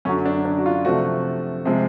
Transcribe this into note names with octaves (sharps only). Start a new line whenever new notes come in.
F#2 D3 F#3 C#4
D4
D4
F#4
F4
C3 F3 A3 F#4
C3 F3 G#3